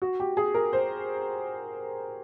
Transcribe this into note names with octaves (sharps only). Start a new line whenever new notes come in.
F#4
G4
G#4
A#4
C5